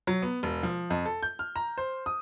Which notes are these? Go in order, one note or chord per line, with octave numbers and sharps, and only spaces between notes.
F#3
B3
E1
F3
F2
A4
G6
F6
A#5
C5
D#6